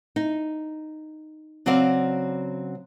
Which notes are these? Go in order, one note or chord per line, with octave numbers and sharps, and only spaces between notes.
D#4
C#3 F#3 C4 F#4 D5 F5